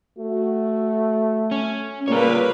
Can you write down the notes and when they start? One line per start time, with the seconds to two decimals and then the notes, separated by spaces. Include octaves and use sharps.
0.18 A3 F#4
1.51 C#4
2.08 A#2 C#3 G3 A#3 F4 B4 C#5